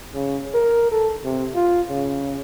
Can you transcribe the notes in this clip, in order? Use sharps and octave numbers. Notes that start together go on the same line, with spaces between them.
C#3
A#4
A4
C3
F4
C#3